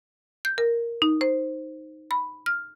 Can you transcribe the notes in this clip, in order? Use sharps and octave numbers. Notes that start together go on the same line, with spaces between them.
G6
A#4
D#4
C5
B5
F6